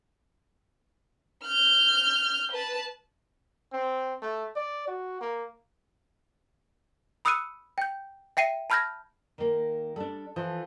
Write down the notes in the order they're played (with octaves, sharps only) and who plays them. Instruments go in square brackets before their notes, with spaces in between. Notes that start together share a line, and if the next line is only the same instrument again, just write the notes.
[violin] F6 G6
B4 A5
[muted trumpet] C4
A3
D5
F#4
A#3
[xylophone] B5 D#6 E6 F#6 C#7 D#7
G5 G6
E5 G5 C7 D#7
A5 B5 F6 G6 G#6 A#6
[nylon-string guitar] D#3 A#3
[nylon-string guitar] G3 D4 [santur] A4
[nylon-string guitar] E3 [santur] F3